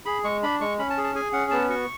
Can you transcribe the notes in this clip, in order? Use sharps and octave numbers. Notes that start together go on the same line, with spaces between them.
G#4 B5
G#3 C#6
D4 B5
G#3 C#6
C#4 B5
A5
G#4
A5
G#4 G#5
C#4 F#5
B3 A5
F#4 C#6